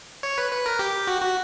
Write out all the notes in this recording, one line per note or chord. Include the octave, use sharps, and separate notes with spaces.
C#5
B4
B4
A#4
G4
F#4
F#4